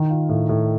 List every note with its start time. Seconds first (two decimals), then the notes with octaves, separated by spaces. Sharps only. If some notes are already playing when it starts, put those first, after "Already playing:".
Already playing: D#3
0.10 F4
0.29 A2
0.49 A2